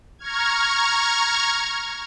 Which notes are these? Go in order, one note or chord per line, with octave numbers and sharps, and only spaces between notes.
A#5 C#6 F6 G#6